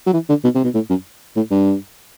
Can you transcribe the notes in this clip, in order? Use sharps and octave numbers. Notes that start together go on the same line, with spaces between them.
F#3
E3
D3
B2
C3
B2
A2
F#2
A2
G2